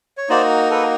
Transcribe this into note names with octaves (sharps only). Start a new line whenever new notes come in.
C#5
A#3 D#4 F#4 C5 D5
A4 B4